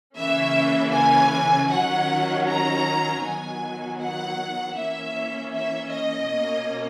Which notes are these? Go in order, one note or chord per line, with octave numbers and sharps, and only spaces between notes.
C#3 E3 A#3 C#4 E5
G#5
D#3 F#3 C#4 F#5
A#5
D#3 F#3 B3 G#5
F#5
E3 A#3 C#4 E5
E5
D#5
B2 A#3 C#4